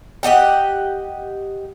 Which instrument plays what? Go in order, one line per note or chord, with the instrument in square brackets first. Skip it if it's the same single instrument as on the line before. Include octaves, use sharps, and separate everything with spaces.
[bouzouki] G4 D#5 F#5 G5